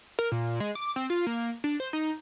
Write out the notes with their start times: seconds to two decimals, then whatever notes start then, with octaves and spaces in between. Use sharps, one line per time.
0.19 A#4
0.32 A#2
0.60 G#3
0.75 D6
0.96 C4
1.10 F4
1.27 A#3
1.64 D4
1.80 C5
1.93 D#4